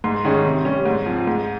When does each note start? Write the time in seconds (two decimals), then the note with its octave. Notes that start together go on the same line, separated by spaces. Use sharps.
0.04 G#2 C6
0.25 D#3 G#3 C#4
0.45 C3
0.65 G3 C#4
0.85 G#2
1.06 F3 C4
1.27 G#2